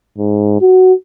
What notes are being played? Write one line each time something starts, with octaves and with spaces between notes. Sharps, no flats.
G#2
F#4